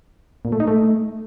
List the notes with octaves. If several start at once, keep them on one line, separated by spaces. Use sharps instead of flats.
A#2
A3
D#4
A3